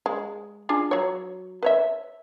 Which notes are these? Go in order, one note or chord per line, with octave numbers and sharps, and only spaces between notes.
G#3
D4 F4 G#4
F#3 C#5
B4 C#5 E5